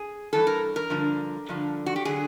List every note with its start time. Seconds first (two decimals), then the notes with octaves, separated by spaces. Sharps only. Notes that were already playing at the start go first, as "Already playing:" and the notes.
Already playing: G#4
0.33 G2 E3 A4
0.47 A#4
0.76 A#4
0.90 G2 D3 F3
1.48 G2 D3 F3
1.86 F#4
1.96 G4
2.05 D3 F#3 G#4